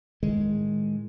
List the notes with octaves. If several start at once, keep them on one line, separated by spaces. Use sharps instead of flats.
A2 D#3 G#3